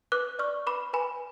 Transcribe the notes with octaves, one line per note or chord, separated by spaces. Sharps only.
B4 D6 F#6
D5 C#6 F6
B4 B5 D6
B4 G#5 B5